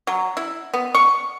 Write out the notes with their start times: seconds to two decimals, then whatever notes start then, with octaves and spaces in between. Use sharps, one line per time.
0.07 F#3
0.37 E4
0.74 B3
0.95 C#6